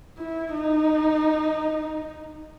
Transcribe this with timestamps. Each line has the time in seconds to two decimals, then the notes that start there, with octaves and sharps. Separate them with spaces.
0.18 E4
0.54 D#4